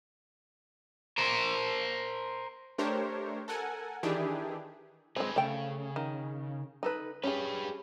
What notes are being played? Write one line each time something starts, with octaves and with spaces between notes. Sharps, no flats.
A#4 C5
A3 D4 G4 A#4 C5 C#5
A4 A#4 F#5 G#5
D#3 E3 D4 E4 G4 G#4
G#3 C4 G#4 B4
C#3 A3 G5
D#3
D#4 A4 B4
C#4 G4 G#4 B4